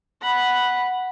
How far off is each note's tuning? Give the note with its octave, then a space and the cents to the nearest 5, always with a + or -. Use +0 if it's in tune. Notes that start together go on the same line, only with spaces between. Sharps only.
F#5 +0 B5 -5